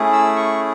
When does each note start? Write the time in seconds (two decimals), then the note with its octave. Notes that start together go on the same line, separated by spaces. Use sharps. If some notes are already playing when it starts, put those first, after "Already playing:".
Already playing: A3 C#4 E4 G#4
0.13 E6
0.36 C#6